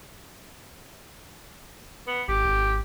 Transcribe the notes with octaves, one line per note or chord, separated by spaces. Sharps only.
B3
G#1 G4
G#1